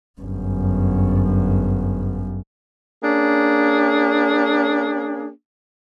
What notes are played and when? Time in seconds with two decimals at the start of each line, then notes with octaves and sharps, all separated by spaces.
0.21 G1 F#2
3.03 A#3 C#4 D4 G#4